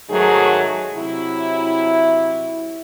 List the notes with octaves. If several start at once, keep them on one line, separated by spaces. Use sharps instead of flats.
G#2 D#3 F#3 A3 G#4
C3 F#3 E4